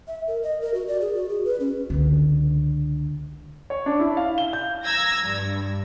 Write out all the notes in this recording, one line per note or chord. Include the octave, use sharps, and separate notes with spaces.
E5
A#4
D#5
A#4
F#4
D5
G#4
F#4
G#4
B4
C#4
C#2 D3
C#5
D4
E4
F5
G7
G6
A#5 E6 G#6 A#6
G2